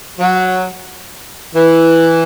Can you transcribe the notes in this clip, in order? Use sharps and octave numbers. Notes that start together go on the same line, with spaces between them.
F#3
E3